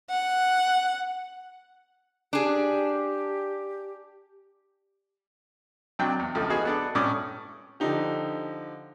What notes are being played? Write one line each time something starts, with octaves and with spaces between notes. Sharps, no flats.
F#5
D4 G4 G#4
D#2 C3 F#3 D4 G5
E2
C#2 F3 A3
B3 D#4 F#4 G#4
B3 D4 A4
A2 C#4 D5 D#6
D3 F3 D#4 G4